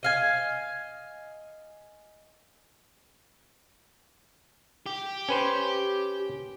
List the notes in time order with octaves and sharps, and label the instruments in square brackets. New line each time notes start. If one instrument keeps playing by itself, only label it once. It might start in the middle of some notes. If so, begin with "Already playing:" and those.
[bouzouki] D#5 F5 G#5
[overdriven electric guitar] G4
[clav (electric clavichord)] C#4 B4 C5